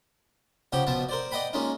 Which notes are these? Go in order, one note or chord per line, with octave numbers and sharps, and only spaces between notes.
C#3 F3 G4 F#5 G5
B2 F3 B3 F4 A5
A#4 C5 D5
D5 D#5 F#5 G5 B5
G#3 A#3 C#4 D#4 F4